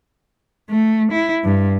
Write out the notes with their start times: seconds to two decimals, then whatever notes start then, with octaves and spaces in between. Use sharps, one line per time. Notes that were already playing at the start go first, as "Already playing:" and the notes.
0.70 A3
1.12 E4
1.44 G2